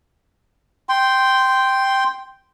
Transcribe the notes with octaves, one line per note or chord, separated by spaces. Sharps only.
G5 C6